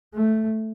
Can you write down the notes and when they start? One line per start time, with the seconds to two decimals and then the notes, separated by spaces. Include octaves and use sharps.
0.14 A3